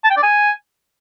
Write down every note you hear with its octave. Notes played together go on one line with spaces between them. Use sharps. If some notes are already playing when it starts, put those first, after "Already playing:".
A5
G5
D5
G#5